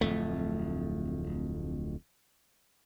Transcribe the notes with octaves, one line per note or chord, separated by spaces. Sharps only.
D1 F2 A3